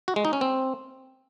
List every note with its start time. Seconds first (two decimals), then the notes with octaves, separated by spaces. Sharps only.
0.08 F#4
0.16 G#3
0.25 D#4
0.33 C#4
0.41 C4